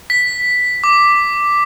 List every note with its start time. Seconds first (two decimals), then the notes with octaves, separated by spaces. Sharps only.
0.10 B6
0.84 D6